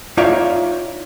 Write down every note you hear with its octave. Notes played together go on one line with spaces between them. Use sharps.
D#4 F4 C#5 D5 E5 F5